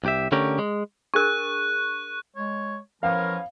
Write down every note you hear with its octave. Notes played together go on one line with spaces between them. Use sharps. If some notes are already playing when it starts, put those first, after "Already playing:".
C2 G4 E5
D3 A3 C#4 G4 A#4
G#3
D4 G#4 A#4 C#6 F#6
G#3 C#5
E2 F3 B3 C#4 A#4 F5